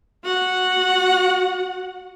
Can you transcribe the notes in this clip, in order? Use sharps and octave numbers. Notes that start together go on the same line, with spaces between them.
F#4 F#5